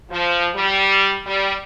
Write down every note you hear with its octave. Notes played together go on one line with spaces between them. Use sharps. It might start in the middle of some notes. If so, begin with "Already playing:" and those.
F3
G3
G3